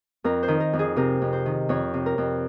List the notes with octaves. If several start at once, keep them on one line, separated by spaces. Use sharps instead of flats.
F2 A#4
C5
D#3
A#4
F2
G#4
C3 A#4
F2
C5
D#3
F2 C#5
C3
A#4
F2